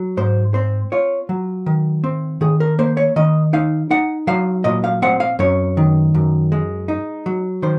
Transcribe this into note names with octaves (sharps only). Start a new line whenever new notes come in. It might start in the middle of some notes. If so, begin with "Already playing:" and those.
Already playing: F#3
G#2 C5
C4 C5
F4 C#5
F#3
D#3
C4
D#3 G#4
A#4
A#3 C5
C#5
D#3 D#5
D#4 F5
D#4 F#5
F#3 F5
A#2 D#5
F5
C4 F#5
F5
F#2 C#5
D#3
F#2
G#3
D#4
F#3
D#3 C5